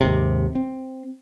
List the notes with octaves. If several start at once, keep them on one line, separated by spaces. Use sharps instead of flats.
D#2 G#2 C3
C4